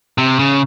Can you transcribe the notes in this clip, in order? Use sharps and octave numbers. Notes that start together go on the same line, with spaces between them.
C3
C#3